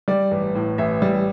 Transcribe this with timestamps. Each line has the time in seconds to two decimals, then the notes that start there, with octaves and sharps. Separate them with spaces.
0.08 G3 D5
0.31 A1
0.55 A2
0.78 A1 E5
1.02 G3